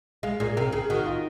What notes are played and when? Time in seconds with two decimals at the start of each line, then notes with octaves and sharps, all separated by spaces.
0.23 G#3 F5
0.40 A#2 G#4
0.57 C3 A#4
0.72 C#3 G#4
0.89 D#3 F#4
1.06 F4